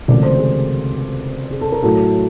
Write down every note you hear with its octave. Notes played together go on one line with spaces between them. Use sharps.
C#2 C3 D#3 F#3 A3 D5
C5
G#4
G#4
A4
A#4
A2 F#3 A3 A4